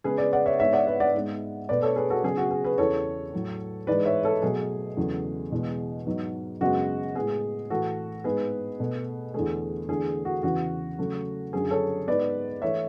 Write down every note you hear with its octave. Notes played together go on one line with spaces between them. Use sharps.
C#3 G#3 B3 G#4 B4
B4 D5
D5 F#5
C#5 E5
G#2 G#3 B3 C#5 E5
D5 F#5
B4 D5
D5 F#5
G#2 G#3 B3
B2 A3 B4 D5
A4 C#5
G#4 B4
F#4 A4
C#3 F#3 B3 G#4
F#4
G#4
G#4 B4
E2 C#3 E3 A4 C#5
A2 F#3 A3
G#2 E3 G#3 B4 D5
C#5 E5
A4 C#5
B2 F#3 A3 G#4
E2 C#3 F#3 A3
E2 B2 G#3
G#2 F#3 B3
F#2 C#3 G#3 B3 F#4
A2 G#3 B3 G#4
A2 E3 A3 F#4 A4
G#2 G#3 B3 G#4 B4
B2 A3
E2 D3 A3 G#4
E2 D3 A3 G#4
F#4
E2 C#3 E3 F#4
C#3 F#3 A3
F#2 D3 F#3 G#4
A4 C#5
G#2 G#3 B3 B4 D5
E3 A3 C#5 E5